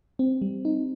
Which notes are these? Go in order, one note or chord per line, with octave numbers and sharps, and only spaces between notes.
C4
G3
D#4